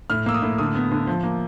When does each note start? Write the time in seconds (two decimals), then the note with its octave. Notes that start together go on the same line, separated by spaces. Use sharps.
0.10 A2 F6
0.26 A#3 E6
0.34 D#6
0.42 A2
0.58 D3 D#6
0.75 B3
0.92 D3
1.07 F3
1.24 A#3